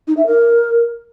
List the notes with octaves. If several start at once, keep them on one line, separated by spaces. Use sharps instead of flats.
D#4
E5
A#4